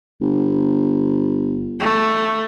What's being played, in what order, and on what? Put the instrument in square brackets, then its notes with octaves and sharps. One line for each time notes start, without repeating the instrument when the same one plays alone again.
[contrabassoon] G1
[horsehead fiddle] A3